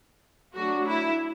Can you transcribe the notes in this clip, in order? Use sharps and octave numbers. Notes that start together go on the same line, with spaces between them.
F#3 A3 D4 F#4
E4